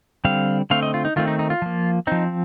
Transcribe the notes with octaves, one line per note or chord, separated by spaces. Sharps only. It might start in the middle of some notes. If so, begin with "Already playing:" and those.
D3 G3 C4 F5
D3 A3 C4 F5
D#5
F4
D#4
D#3 A3 C4 F4
D#4
D#4
F4
F3 A#3
F3 C4 D#4